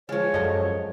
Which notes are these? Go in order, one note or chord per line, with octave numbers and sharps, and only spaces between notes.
F3 G#3 F4 C#5
F#2 A4 D5 D#5